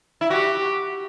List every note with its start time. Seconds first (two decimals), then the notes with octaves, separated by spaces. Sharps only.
0.21 E4
0.30 F#4 G4